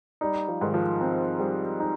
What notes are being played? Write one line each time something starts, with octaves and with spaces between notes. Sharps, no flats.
G3 D#4
F3
G#2 D#3
F3
C4
G3
D#4